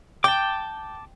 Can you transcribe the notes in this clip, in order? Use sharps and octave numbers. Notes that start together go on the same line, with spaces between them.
G5 A5 D6